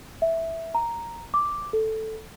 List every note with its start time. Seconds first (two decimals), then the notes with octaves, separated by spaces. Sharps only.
0.22 E5
0.75 A#5
1.34 D6
1.73 A4